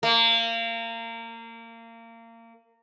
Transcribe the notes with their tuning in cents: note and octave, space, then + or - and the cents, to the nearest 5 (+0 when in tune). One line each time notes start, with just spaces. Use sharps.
A#3 -25